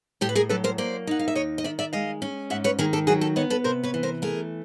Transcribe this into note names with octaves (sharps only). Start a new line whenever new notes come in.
A2 G4 A4
B4
G#4 A#4
F#3 A4 B4
A#4 C5
A#3 C5 D5
D#4 F#5
F5
E5
D#2 C#5 D#5
D#5
D#3 D5 E5
D5 E5
G#3 D#5 F5
C#4
G#2 E5 F#5
B4 C#5
D#3 G#4 A#4
G4 A4
F#3 F#4 G#4
G4 A4
B3 C#5 D#5
A4 B4
C3 A#4 C5
B4 C#5
E3
A#4 C5
A3 G#4 A#4